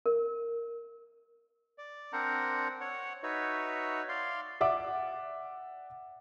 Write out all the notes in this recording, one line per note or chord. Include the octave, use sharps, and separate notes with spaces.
A#4
D5
C4 D4 A#4 C5 F#5 A#5
C#5 F#5
D#4 F#4 B4 C#5 E5
D5 F5 C6
D5 E5 F#5 D6